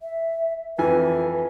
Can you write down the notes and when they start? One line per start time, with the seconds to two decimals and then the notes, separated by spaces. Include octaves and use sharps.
0.01 E5
0.78 F2 E3 B4 G#5